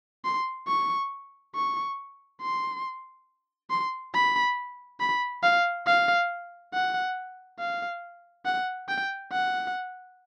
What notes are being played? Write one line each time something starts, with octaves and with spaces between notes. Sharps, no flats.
C6
C#6
C#6
C6
C6
B5
B5
F5
F5
F#5
F5
F#5
G5
F#5